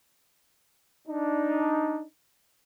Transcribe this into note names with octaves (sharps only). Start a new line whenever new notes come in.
D4 D#4